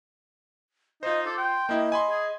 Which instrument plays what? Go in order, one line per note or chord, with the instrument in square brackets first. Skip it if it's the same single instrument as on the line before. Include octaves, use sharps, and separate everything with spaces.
[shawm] D#4 [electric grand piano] F4 C5 [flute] D#5
[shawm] A4 [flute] D6
[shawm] G5 [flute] C6
[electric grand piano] A#3 E4 [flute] D#5
[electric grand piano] G#5 B5 C6
[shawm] G#4